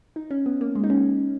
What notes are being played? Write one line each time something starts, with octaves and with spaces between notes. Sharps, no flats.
D#4
C#4
B3
A#3
G#3
D#4
C#4